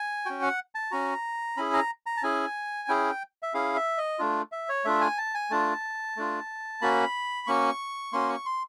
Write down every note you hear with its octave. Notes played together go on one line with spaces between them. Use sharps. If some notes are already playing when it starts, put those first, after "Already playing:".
Already playing: G#5
C#4 F#4 G5
F#5
A5
C#4 F#4 A#5
C#4 E4 G#4 B5
A#5
A#5
A5
C#4 E4 G#4 G#5
C#4 E4 G#4 G5
E5
C#4 E4 G#4 F5
E5
D#5
A3 D4 F4
E5
C#5
A3 D4 F4 E5
G#5
A5
G#5
A3 D4 F4 A5
A3 D4 F4
A#3 C#4 F#4 B5
A#3 C#4 F#4 C#6
A#3 C#4 F#4 C6
C#6
C6